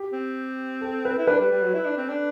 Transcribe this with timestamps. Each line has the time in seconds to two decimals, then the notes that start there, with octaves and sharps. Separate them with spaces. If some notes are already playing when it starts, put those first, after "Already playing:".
Already playing: G4
0.13 C4
0.81 A4
1.05 B4
1.18 E4
1.27 D4 B4
1.40 G3
1.51 G3
1.63 F#3
1.74 E4
1.85 D4
1.97 C4
2.09 D4